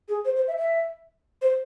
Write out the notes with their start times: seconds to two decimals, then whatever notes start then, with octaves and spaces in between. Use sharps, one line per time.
0.08 G#4
0.25 C5
0.36 C5
0.47 E5
0.58 E5
1.41 C5